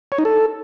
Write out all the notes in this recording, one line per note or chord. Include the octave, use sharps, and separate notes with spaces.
C#5
D#4
A4